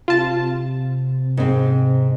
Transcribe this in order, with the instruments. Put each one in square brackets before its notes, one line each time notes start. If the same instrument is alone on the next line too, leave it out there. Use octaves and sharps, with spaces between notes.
[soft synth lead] C3 [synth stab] F4 A5
[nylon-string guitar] G#2 C4